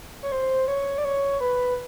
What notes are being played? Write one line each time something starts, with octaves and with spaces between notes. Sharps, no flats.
C#5
C5
C#5
D5
C#5
B4